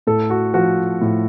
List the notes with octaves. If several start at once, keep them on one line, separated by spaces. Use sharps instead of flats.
A2 A4
F#4
F3 F#4
A2